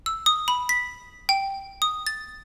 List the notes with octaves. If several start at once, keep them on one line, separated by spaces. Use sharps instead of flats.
E6
D#6
B5
B6
G5
D#6
A6